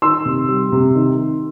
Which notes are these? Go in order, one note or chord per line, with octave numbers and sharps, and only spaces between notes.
D#3 C6 E6
C3
G3
C3
D#3